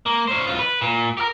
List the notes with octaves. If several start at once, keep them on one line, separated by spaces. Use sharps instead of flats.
A#3
C#4 C5
B1 F4
B4
A#2
G4 A#4